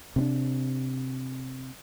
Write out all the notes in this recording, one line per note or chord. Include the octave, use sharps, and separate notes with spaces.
C3 C4 D4